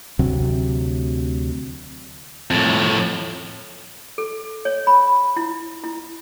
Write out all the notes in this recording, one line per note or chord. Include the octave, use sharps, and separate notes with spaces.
D2 C3 F#3
F2 A2
A4
C#5
B5
E4
E4